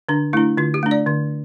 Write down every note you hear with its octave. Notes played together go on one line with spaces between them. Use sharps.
D3 D4
A3 D4 E4
D3 F4
G4
A3 D4
D5
D3